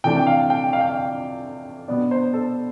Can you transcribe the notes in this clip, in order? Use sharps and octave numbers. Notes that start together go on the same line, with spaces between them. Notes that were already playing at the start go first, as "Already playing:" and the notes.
C3 E3 A3 D4 G5
G5
F5
G5
F5
G5
F5
B2 B3 D4 D5
C5
A4